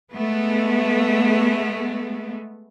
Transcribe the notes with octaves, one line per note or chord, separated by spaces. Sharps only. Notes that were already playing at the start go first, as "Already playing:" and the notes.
G#3 A3 B3